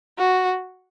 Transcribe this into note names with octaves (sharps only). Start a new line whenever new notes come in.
F#4